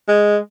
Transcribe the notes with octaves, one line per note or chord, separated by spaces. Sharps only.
G#3